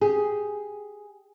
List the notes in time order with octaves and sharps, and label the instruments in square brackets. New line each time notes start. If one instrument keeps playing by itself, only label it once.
[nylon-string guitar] G4 G#4